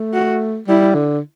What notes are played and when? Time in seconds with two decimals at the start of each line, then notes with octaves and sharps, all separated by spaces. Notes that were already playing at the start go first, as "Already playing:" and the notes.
Already playing: A3
0.13 F#4
0.68 G3 E4
0.95 D3